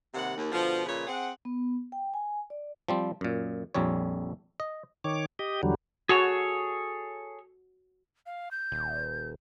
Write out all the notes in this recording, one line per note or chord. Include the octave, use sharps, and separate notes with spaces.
D#2 C3 G3 F#5
D#2
B2 D3 F3
A#2 C#3 F3 B4 C#5
C4 G#4 F#5
B3
G5
G#5
D5
F3 G3 C4
F#2 A#2
A#1 F2 G3 C#5
D#5
D#3 C#5 D6
G4 D#5
E2 D3 F#3 G3
F#4 G#4 A4 C#5
F5
G6
D#1